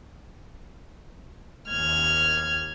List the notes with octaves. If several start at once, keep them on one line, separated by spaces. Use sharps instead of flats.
D#2 F6 G#6